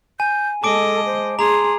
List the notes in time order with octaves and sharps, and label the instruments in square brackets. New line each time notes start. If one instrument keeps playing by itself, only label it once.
[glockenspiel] G#5 [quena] G6
[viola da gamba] G#3 D#5 [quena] A4 [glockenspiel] A5 D6 D7
[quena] C5
[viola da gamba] G#4 [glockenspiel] A#5 F7 [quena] C6